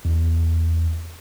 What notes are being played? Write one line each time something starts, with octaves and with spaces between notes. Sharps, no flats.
E2